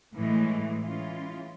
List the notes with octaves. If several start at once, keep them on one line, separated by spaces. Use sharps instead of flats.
A2 E3 G#3
E3 G#3 C#4 F4